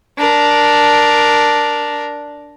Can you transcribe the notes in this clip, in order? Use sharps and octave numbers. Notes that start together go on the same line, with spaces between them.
D4 A#4